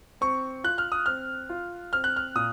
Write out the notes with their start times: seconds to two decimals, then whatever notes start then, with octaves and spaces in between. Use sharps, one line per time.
0.21 C4 C#6
0.64 F4 F#6
0.78 F6
0.92 D#6
1.06 C4 F6
1.50 F4
1.93 C4 F6
2.04 F#6
2.16 F6
2.35 A#2 D#6